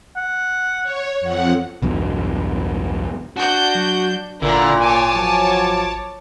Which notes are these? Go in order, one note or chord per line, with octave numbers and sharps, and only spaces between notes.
F#5
C#5
F2 F#5
B1 E2 G2 B2
D4 F#4 G6
F#3
G#1 A#2 D3 E4 A#5
C#5 G#5 A5 D6
F3 F#3